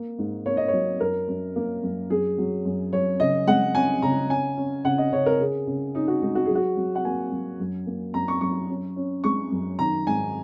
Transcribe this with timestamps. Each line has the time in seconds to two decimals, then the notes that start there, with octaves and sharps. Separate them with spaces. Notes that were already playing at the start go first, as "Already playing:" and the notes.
Already playing: A#3
0.18 G#2
0.46 A#3 C#5
0.57 D#5
0.68 F#3 C#5
1.00 F#2 A#4
1.28 F#2
1.56 A#3
1.83 F#2
2.10 F#2 G#4
2.38 F#3
2.65 F#2
2.93 F#2 C#5
3.20 C#3 D#5
3.47 G#3 F#5
3.75 C#4 G#5
4.02 C#3 A#5
4.30 C#4 G#5
4.57 C#4
4.84 C#3 F#5
4.98 D#5
5.12 C#3 C#5
5.26 A#4
5.39 C#3 G#4
5.67 C#3
5.95 C#4 D#4
6.08 F#4
6.22 G#3 D#4
6.35 F#4
6.45 F#3 G#4
6.55 F#4
6.77 F#3
6.95 F#5
7.05 A#3 G#5
7.32 F#3
7.60 F#2
7.87 A#3
8.14 F#2 A#5
8.28 C#6
8.41 F#2 C#6
8.70 C#4
8.96 C#4
9.24 G#3 C#6
9.52 F#2
9.79 D#3 A#5
10.07 G#2 G#5